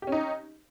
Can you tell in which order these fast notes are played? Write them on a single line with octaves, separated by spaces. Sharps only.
G4 C#4 D#4